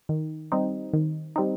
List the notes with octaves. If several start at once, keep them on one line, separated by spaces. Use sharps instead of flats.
D#3
G3 C4 D#4
D#3
G3 C4 D#4